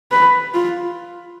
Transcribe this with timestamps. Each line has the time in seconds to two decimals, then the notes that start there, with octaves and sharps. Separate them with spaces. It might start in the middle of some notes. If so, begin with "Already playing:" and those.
0.11 B4
0.54 F4